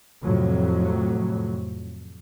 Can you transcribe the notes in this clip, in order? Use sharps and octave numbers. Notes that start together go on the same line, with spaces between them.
F2 A2 C3 F#3